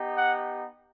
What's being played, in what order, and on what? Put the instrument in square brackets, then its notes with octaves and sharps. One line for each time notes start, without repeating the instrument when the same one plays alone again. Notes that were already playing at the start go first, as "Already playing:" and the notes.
Already playing: [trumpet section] B3 D#4 G4
F#5